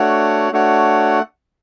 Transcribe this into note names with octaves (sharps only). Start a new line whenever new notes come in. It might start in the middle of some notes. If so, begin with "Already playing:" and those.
Already playing: A3 D4 F#4 C#5 F#5
A3 D4 F#4 C#5 F#5